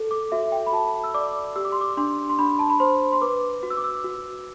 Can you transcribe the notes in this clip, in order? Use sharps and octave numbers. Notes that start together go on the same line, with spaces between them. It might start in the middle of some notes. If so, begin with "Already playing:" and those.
Already playing: A4
D6
F#4 E5
G5
B5
F#4 A5
E6
D5 D6
G4 E6
D6
C6
D6
D4 C6
C6
D4 B5
A5
B5
C5 C6
C6
B4 D6
F#4
E6
D6
E6
F#4